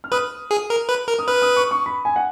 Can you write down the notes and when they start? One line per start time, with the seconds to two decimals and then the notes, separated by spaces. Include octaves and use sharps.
0.04 F6
0.12 B4 D#6
0.51 G#4
0.70 A#4
0.89 B4
1.08 A#4
1.19 D#6
1.27 B4 F6
1.42 D#6
1.56 C#6
1.71 C#6
1.86 B5
2.05 G#5
2.16 F#5